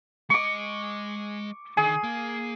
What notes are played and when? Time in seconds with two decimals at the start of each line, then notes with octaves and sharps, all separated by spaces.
0.30 G#3 D#5 C#6 D6
1.77 D3 D#3 G#4 G#5
2.04 A#3